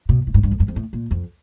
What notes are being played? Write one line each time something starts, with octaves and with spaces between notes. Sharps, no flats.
B2
A2
G#2
G2
F2
F#2
F2
A2
A#2
F2